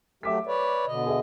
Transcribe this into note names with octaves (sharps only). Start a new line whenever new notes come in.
F#3 A3 G4 E5 D6 B6
B4 C#5 D5
B2 D3 D#5
G#4 E5